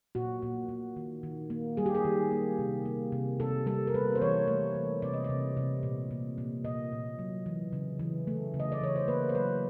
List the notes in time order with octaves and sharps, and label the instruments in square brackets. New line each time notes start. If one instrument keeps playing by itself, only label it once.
[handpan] A#2 F#4
A#2
A#2
D#3
D#3
A#3
G3 G#4
G4
G#4
D#3
A#3
C3
A#3
C3
C3 A4
G3 A4
A#4
A#3 B4
C5
E3 C#5
A3
E3
C3 D5
D#5
D5
C3
C3
A#2
A#2
A#2
A#2 D#5
A#2
F#3
E3
C#3
E3
A3
C#3
D#5
D5
E3 C#5
C5
A#3 B4
C5
F#3 B4